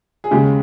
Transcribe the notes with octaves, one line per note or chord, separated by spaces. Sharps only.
G#4
D#2 C#3 G#3 G4